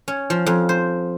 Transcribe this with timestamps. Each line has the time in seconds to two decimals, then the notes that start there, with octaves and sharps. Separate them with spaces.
0.08 C#4
0.30 F3
0.46 F2
0.69 C5